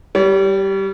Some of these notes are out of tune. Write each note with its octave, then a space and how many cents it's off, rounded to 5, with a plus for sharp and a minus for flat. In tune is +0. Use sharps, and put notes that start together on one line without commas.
G3 -10 C#5 +45